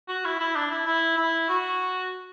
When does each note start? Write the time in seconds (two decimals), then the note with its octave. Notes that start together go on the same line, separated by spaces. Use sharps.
0.08 F#4
0.25 E4
0.40 E4
0.56 D4
0.70 E4
0.87 E4
1.17 E4
1.49 F#4